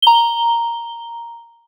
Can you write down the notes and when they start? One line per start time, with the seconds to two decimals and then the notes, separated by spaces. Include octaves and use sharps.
0.02 A#5 G7